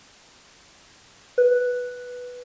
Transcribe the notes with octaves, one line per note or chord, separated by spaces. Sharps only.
B4